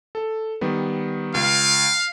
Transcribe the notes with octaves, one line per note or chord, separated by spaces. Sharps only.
A4
D#3 G3 B3
C#2 F5